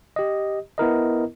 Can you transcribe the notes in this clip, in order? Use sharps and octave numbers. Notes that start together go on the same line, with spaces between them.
G4 D#5
B3 E4 A#4 D#5